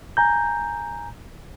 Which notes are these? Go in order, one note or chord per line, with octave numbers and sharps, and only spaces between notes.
G#5 A#5 G6